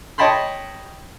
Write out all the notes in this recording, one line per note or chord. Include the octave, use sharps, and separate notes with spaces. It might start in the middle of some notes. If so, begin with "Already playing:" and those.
C#5 D#5 G5 A5 B5 C6